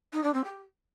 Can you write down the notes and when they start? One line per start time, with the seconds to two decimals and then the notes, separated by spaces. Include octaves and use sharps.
0.13 D#4
0.23 D4
0.34 C4
0.44 G4